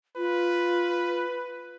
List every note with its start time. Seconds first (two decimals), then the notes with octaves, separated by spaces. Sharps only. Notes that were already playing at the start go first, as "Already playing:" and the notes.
0.17 F4 B4